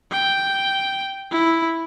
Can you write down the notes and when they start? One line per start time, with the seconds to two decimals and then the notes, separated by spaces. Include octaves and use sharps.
0.12 G5
1.31 E4